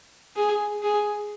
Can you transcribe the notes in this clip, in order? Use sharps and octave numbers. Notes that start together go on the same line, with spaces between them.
G#4
G#4